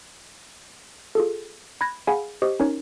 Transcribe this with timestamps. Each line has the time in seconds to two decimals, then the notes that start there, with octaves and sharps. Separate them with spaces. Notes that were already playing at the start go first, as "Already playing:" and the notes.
1.15 F4 G#4 A4
1.81 B5 F#6 G#6 A#6
2.07 G#4 F5 F#5 G#5 B5
2.42 G4 C5 D#5 C#6 D#6
2.60 C#4 D#4 A#4 C#5